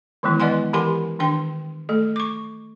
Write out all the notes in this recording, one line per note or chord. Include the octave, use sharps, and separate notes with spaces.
D#3 E3 F#3 G#3 B3 E4
B4 D5 D#5 F#5 G#5 C6
E3 G4 A#4 F#5 G#5 C6
D#3 D4 G5 C6
A3 A4
C#6 D6